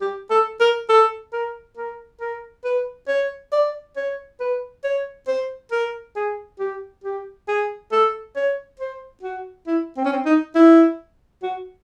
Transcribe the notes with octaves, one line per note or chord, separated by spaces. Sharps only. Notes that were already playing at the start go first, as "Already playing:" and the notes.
G4
A4
A#4
A4
A#4
A#4
A#4
B4
C#5
D5
C#5
B4
C#5
C5
A#4
G#4
G4
G4
G#4
A4
C#5
C5
F#4
E4
C4
C#4
C4
D#4
E4
F#4